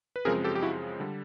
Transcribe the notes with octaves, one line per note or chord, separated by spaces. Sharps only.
B4
F#2 C#3 F3 G#3 C4 G#4 A#4
G4 A4
G4
E4 F#4
D3 G3